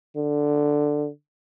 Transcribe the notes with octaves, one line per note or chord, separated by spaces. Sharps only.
D3